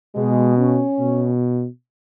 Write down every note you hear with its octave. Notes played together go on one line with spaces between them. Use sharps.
B2 G#3
C#4
B2